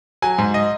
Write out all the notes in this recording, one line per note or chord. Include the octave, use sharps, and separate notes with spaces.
F#3 G#5
G#2
D#5